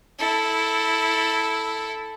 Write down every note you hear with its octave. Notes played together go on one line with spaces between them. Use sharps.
E4 A4